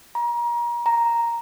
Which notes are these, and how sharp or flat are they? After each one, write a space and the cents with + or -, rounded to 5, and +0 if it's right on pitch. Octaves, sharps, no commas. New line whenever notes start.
A#5 +30
A#5 +0